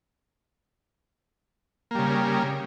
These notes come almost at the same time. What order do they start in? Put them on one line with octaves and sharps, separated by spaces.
A#3 G3 C#3